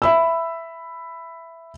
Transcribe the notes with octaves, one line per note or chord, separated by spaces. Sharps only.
E5 B5 E6